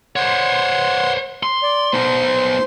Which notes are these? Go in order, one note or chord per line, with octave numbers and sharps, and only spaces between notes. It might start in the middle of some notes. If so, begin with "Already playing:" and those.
C5 C#5 F#5 C6
C6
D5
B3 D#4 C5 C6